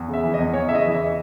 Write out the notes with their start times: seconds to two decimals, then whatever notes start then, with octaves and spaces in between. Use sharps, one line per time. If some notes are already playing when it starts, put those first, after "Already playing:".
Already playing: E2
0.08 C#3
0.13 E5
0.24 E3
0.34 D#5
0.39 E2
0.54 E2 C#5
0.69 C#3 E5
0.75 D#5
0.85 E3
0.94 E5